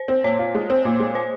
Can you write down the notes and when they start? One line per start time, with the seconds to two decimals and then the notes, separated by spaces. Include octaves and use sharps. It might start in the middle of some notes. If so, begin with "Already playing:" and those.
Already playing: C5
0.08 C4
0.24 A#2 C#5
0.39 F4
0.55 G#3
0.70 C4
0.85 A#2
1.00 G#3
1.15 C5